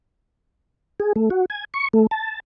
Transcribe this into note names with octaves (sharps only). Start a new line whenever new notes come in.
G#4
A3
F#4
G#5
C#6
A3
A5